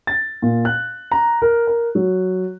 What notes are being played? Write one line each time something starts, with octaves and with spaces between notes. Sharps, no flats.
A6
A#2
F#6
A#5
A#4
A#4
F#3